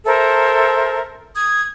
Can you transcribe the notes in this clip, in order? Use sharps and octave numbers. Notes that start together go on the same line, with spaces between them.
A4 A#4 C5 E5
D#6 G#6